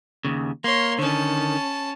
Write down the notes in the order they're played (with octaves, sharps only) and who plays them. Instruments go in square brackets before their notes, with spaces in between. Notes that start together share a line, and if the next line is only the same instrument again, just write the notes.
[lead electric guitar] D#2 C#3
[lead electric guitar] A#3 [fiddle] C#5 C6
[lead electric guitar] D3 D#3 [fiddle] C#4 A5